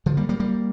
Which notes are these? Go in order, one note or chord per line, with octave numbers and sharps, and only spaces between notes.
D3 F3
G3 A#3
G3 A#3
G3 A#3